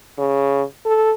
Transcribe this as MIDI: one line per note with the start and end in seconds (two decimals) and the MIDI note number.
0.18 0.63 49
0.85 1.12 69